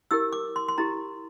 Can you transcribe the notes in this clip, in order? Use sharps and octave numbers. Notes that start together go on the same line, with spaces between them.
E4 G4 A#4 E6
D6
C6
C6
E4 G4 A#5